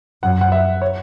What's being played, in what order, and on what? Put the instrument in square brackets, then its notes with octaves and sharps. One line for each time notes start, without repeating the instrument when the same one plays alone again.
[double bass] F#2 [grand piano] F#5
[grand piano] F#5
E5
C#5